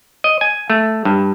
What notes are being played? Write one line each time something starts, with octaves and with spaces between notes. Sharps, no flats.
D#5
G#5
A3
G2